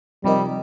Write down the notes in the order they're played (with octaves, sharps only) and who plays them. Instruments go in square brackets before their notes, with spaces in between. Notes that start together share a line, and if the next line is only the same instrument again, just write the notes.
[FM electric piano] C3 F3 D#4 A#4 D#5 [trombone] G3